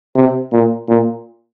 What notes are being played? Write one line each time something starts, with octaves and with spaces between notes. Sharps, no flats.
C3
A#2
A#2